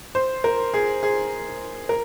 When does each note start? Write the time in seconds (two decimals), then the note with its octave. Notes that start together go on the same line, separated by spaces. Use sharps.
0.15 C5
0.44 A#4
0.74 G#4
1.03 G#4
1.89 A#4